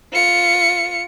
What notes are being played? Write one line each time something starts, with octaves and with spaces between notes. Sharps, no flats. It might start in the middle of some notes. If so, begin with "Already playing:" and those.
F4 C#7